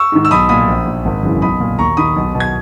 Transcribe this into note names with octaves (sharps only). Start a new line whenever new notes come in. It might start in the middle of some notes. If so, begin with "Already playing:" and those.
Already playing: C#6 E6
G#2 D#3
E6
B1 B5 D#6
A#2 B5 D#6
A#1
A#2
G#1
F#2 C#3 E3
B1 B5 D#6
A#2
D#2 A#5 C#6
D#3 B5 D#6
B1
B2
G#6